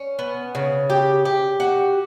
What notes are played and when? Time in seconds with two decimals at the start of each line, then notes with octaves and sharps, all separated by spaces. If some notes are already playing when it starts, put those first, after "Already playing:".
Already playing: C#4
0.19 B3
0.55 C#3
0.90 G4
1.25 G4
1.60 F#4